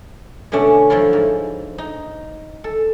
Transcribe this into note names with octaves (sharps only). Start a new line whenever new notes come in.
B2 D3 A3 C#4 D4
F3 F#3 A3 E4 F4
G#2
D#4
A4